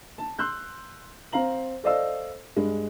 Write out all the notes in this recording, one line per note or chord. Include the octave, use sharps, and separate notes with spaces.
A5
C6 E6 F#6 G6
C4 C5 F5 A#5 F#7
A4 C5 D5 D#5 F5 E6
G2 G#3